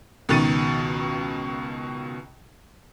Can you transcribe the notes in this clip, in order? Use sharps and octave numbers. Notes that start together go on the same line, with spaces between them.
C#2 B2 D#3 A6 C#7 D#7